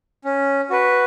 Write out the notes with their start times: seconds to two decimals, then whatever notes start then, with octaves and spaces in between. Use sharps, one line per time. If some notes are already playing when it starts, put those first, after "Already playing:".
0.24 C#4
0.70 F#4 B4